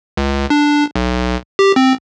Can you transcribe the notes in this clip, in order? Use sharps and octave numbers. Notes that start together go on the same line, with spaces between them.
C#2
D4
B1
G4
C4